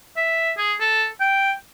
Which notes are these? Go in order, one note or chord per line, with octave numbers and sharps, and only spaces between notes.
E5
G#4
A4
G5